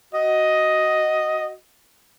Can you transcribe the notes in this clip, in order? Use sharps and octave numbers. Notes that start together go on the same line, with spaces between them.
F#4 D#5